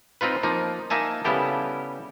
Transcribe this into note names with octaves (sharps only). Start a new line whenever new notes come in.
C4 D#4 F4 B4
F3 A#3 D#4
A#3 D#4 E5 G#5 A5
C#3 G3 B3 E4 G4 A4